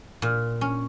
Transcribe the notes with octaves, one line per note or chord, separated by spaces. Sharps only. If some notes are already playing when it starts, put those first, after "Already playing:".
A#2
C#4